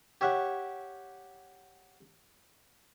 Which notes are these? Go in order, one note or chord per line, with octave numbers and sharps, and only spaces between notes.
G4 C#5 E5 F#5